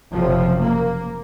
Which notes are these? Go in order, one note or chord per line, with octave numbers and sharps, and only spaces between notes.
F#1 F2 C3 F3
A#3